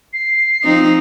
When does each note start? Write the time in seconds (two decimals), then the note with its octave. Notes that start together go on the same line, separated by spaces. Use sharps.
0.13 C7
0.64 F3 C4 D#4